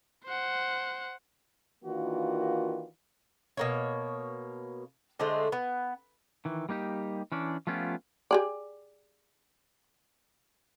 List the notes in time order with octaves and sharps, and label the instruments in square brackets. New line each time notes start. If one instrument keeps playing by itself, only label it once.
[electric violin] C5 F#5
[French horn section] D#3 E3 A#3 D4 F4 F#4
[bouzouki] B2 A#3 C#5
D3 G#3 A3 C5
B3
[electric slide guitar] D#3 E3
G3 A#3 D#4 G4
E3 C#4 D4
F3 A3 B3 C#4 F4 G4
[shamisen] G4 G#4 D5